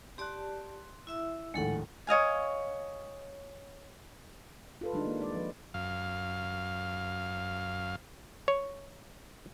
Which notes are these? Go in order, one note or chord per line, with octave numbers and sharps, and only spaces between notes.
G4 D5 A5 C6 F#6
E4 E5 E6
A#1 D#2 A2 G#3 A4 F#5
C#5 D#5 F5 G#5
F4 A4 B4
D#3 G3 G#3 D4 D#4
A#3
G#3 D5
F3 B4
F#2 F5
C#5